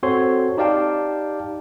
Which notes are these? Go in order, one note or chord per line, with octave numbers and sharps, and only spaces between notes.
C4 F#4 A4 C5 C#5 C6
D#4 G4 D5 F5 G5 A5